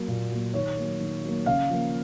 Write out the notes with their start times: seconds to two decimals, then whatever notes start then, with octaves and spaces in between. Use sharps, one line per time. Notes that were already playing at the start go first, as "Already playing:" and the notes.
Already playing: F#3 A#3
0.08 A#2
0.31 F#3 A#3
0.54 D#3 C#5
0.77 F#3 A#3
1.00 D#3
1.24 F#3 A#3
1.46 C#3 F5
1.70 F3 A#3